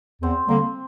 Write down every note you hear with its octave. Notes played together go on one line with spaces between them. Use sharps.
E2 C4
D3 G3 A#3 C4